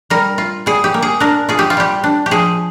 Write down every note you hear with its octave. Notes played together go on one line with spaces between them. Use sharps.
G3 A#4
F4
G3 G#4
G4
A#3
G#4
D4 A#4
F4 G#4
G4
F4
G3 G4
D4
G4
F3 G#4